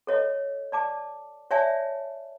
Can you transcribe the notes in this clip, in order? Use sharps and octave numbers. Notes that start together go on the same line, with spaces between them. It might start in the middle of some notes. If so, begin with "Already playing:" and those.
A4 C#5 D#5
D5 A5 D6
C#5 D5 E5 G#5 A5